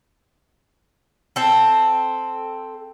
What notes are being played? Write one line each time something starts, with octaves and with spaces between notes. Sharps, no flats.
C4 A4